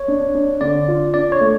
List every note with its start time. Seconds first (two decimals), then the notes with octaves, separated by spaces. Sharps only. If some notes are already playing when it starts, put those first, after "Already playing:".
Already playing: C#5
0.08 D4
0.35 D4
0.61 D3 D5
0.88 F4
1.14 D4 D5
1.32 C#5
1.41 A3